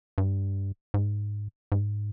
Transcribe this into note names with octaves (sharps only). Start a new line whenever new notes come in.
G2
G#2
G#2